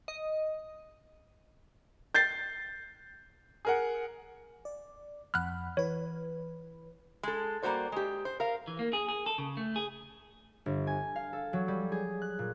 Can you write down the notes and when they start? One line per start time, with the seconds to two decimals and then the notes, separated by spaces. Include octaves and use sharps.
0.08 D#5
2.14 G6 A6 C7
3.65 G#4 A#4 F#5
4.65 D5
5.34 F2 F#5 B5 F6 F#6
5.77 E3 B4 C#5
7.23 G#3 A4
7.62 G3 A#3 B3 F#4 C5 D5
7.92 G#3 G4
8.25 C5
8.40 A#4 F5
8.68 E3
8.79 A#3
8.93 G#4
9.09 G#4
9.26 A4
9.38 C#3
9.57 A3
9.76 G#4
10.66 G1
10.87 G#5
11.16 F5
11.33 A4
11.53 F#3
11.68 G3
11.92 G#4
12.22 F#6
12.39 A#2